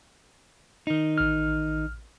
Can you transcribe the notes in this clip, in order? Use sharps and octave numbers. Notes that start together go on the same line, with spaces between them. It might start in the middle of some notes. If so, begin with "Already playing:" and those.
D#3 D#4
A1 F6